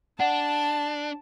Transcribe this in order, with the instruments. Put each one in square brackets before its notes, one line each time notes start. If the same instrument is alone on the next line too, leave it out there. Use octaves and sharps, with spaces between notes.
[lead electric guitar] D4 [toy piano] F#5 [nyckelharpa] A5